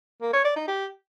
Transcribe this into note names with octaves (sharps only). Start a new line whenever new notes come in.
A#3
C#5
D5
D#4
G4